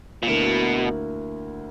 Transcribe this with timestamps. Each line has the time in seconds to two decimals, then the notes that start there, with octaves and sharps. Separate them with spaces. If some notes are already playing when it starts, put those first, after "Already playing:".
0.23 A#2
0.27 D2 B2 D3 A#3 E4 A#4